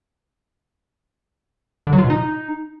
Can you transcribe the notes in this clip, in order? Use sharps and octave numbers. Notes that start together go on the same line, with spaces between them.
D3
F#3
F4
B2
D#4